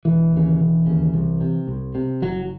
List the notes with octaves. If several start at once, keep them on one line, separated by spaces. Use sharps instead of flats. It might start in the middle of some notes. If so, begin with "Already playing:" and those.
E1 E3
D#2 C#3
E1
D#2 C#3
C2
C3
C2
C3
F#1 F#3